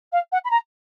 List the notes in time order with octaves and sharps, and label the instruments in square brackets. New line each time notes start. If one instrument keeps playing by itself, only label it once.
[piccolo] F5
F#5
B5
A#5